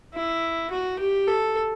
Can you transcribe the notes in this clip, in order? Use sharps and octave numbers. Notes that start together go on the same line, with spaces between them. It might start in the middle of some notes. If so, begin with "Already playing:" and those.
E4
F#4
G4
A4